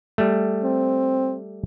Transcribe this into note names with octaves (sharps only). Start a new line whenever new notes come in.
G3 A3
C4